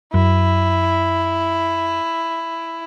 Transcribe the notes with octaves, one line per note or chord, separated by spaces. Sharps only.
F#2 E4